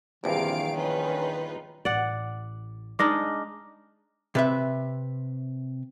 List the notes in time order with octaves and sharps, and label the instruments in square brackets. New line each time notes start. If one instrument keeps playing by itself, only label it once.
[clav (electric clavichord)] A#1 E2 G2 [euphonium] C3 [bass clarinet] D#3 [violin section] F5 D7
[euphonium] C#4 [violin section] D#4 F4 B4
[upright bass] A1 [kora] D5 F#5
[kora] G#3 D4 D#4 [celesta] D6 F6 A#6
[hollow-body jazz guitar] C3 B4 E5